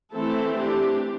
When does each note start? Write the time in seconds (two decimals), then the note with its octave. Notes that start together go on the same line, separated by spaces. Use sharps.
0.13 E3 A3 C4 E4 A4
0.57 D4 G4